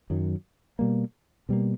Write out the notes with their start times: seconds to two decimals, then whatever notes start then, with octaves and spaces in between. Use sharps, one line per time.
0.10 F#2 D#3 F#3
0.79 B2 G3 A#3
1.49 B2 G3 A#3